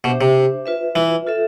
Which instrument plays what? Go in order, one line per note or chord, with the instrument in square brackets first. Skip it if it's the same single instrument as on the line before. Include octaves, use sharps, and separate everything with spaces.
[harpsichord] B2 [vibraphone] D4 G4 C5 E5
[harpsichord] C3
[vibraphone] F4 B4 E5
[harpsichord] E3
[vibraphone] F4 A4 E5